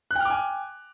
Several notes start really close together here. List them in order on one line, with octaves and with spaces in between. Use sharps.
F#6 G5 F6 D6 G#5